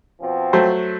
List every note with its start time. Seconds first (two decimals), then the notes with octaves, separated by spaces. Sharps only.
0.21 B2 F3 C4
0.53 F#3 A3 C5